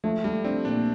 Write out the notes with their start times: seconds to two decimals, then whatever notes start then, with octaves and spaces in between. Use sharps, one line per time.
0.04 F3 A3
0.24 G3 A3
0.44 C4 D4
0.65 A#2 D4